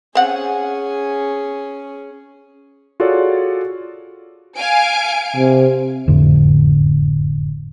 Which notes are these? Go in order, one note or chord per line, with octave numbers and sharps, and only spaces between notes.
C4 C#4 G#4 F#5
F4 F#4 G#4 A4 C#5 D5
F5 G#5 D7
C3
F#1 F2 A2 D3